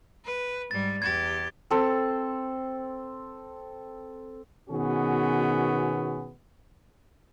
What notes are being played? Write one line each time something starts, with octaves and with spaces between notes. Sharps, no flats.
B4
G#2 G3 A6
E2 G4 G#6 A6
C4 A4
B2 D#3 B3 C#4 F#4 G#4